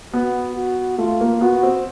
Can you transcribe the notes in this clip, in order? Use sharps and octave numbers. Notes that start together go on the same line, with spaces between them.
B3 F#4
F#4
A3 F4
A#3
B3 F#4
C4